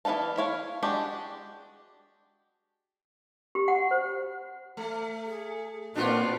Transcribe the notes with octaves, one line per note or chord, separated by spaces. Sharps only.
E3 B3 D#4 F5 A5
E4 C#5 F5
G#3 D4 F#4 G4
G4
F#5
C5
A3
G#4
A#2 B3 C4 D4 F4 F#4